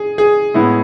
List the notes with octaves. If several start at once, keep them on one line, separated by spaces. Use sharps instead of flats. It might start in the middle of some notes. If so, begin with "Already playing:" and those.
Already playing: G#4
G#4
A2 G#3 B3 E4